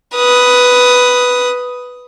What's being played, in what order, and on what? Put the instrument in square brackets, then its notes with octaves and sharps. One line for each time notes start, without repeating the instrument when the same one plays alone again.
[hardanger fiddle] B4 D#6